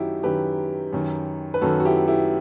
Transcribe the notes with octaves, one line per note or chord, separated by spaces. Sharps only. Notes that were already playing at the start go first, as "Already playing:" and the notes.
Already playing: F#2 D#3 D#4 E4 F#4 G4
F#2 D#3 G4 B4
F#2 D#3
B4
F#2 D#3 F#4 A4
F#4
E4 G4
E4 G4